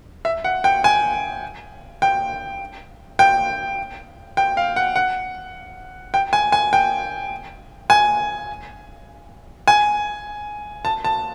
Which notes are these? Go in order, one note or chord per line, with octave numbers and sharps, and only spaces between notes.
E5
F#5
G5
G#5
G5
G5
G5
F5
F#5
F#5
G5
G#5
G#5
G5
G#5
G#5
A5
A5